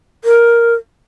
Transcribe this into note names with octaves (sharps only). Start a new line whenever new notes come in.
A#4